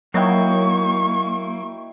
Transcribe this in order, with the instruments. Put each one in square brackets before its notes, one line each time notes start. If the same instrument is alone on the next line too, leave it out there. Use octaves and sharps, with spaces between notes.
[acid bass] F#3 [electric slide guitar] A#3 [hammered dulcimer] D#4 E4 G5 [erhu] C#6